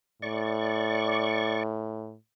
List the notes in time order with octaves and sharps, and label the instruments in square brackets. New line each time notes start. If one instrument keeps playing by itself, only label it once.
[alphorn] A2 [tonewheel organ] D5 C#6